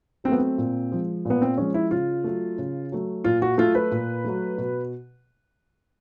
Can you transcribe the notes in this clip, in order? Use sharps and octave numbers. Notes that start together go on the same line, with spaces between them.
F#3 A3 B3 C4
C4
A#2
F3 G#3
A#2 B3
C4
F3 G#3 C#4
E4
C#3 F4
F#3 A3
C#3
F#3 A3
A#2 F4
F#4
F#3 A3 F4
B4
A#2
F#3 A3
B2